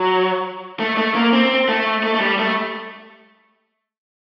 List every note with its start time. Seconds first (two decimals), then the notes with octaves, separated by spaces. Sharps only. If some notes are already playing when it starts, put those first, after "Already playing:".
Already playing: F#3
0.80 A3
0.97 A3
1.15 A#3
1.33 C4
1.69 A3
2.04 A3
2.14 A3
2.21 G3
2.39 A3